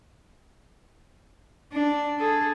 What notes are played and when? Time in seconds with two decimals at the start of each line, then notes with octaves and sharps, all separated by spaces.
1.72 D4
2.19 G#4 A4